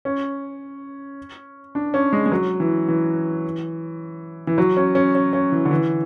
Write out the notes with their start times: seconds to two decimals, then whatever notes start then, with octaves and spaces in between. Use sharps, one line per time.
0.05 C#4
1.75 D4
1.94 C#4
2.13 G#3
2.26 G#3
2.32 F#3
2.60 E3
2.88 E3
4.47 E3
4.58 F#3
4.77 C#4
4.95 C#4
5.15 C#4
5.33 C#4
5.52 E3
5.65 D3
5.71 E3